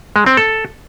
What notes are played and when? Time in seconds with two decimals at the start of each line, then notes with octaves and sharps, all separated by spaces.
0.16 G#3
0.26 C4
0.37 A4